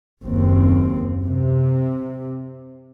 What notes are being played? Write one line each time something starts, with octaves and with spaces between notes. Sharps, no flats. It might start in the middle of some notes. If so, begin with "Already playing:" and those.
F#1 D#2 C4
C3